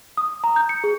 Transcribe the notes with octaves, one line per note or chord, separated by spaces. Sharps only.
D#6
A#5
G6
C#7
G#4